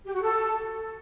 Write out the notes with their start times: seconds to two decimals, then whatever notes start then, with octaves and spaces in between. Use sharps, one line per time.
0.05 G4
0.14 F#4
0.22 A4